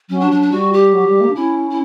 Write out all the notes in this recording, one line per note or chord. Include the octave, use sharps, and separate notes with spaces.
F#3 C#4
D4
F#3 D4
D4
G3 F#4
G4
F#3
G3
A#3
D4
C#4 E4
E4